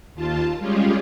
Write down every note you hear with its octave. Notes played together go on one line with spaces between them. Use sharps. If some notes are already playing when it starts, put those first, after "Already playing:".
D#2 F4 A5
G3 G#3 C#4 F4 G4 G#4